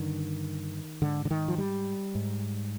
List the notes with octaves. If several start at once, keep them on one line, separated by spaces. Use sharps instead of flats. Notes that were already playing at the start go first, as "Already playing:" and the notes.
Already playing: G2 D3 D#3
G#2 D3
D3
D#3
F3
G3
G#2